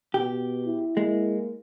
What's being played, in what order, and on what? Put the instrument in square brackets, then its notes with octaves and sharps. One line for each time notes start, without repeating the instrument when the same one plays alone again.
[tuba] B2 [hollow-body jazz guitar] G4
[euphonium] E4
[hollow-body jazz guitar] G#3 [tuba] A#3